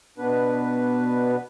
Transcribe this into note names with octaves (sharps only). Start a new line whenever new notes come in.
B2 B3 D4 B4